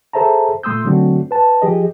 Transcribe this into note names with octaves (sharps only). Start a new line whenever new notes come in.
G#4 A4 C5 E5 A5 A#5
A#2 A3 C6 D#6 E6 G6
D3 F#3 A3 C4 D4 F#4
B4 A5
F3 G4 G#4 D#5